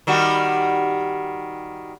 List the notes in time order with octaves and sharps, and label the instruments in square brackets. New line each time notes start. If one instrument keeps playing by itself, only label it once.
[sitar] D#3 G3 F#4